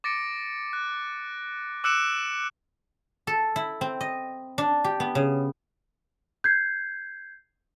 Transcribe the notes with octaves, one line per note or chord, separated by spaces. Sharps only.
D6 A6 A#6 C#7 D7
F#6
D6 E6 F#6 C#7 D7 E7
A4
E4
C4
D#5
D4
G4
B3
C#3
G6 G#6 C7